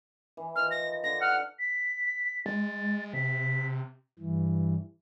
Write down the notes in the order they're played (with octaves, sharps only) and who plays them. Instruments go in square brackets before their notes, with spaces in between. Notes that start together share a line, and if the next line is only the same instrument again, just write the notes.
[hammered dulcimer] E3
[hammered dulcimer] D#3 F3 D#4 [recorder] F6
[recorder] A#6
[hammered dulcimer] D3 D#4 [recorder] A#6
[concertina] F#5 [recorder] F6
[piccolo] B6
[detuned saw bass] G#3 [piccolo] A6
[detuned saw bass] C3 [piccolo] B6
[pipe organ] G2 E3